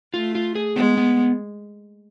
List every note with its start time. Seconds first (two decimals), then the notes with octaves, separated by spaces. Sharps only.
0.14 A3 F4
0.35 F4
0.55 G#4
0.76 G#3 B3
0.97 B3